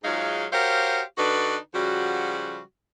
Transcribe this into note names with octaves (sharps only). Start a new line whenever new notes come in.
G#2 F#3 G#3 D#4 F4 F5
F#4 G4 A#4 C5 C#5 F5
D3 D4 D#4 F#4 B4
C#3 F3 G3 F#4